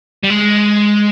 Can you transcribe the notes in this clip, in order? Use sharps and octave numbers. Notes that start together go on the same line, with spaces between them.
G3
G#3